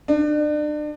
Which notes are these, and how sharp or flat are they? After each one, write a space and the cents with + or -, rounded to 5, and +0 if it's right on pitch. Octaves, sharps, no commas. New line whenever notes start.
D4 +35